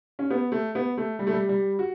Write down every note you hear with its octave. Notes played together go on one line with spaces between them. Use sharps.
C#4
B3
A3
B3
A3
G3
A3
G3
G3
F#4